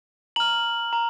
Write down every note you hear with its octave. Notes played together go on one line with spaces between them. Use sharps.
A#5 F6 F#7
A#5